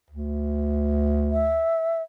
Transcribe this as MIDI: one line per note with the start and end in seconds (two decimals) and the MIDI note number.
0.10 1.63 38
1.32 2.02 76